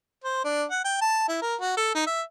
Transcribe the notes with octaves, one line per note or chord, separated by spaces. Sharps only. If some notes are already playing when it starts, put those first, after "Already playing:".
C5
D4
F#5
G5
A5
E4
A#4
F#4
A4
D#4
E5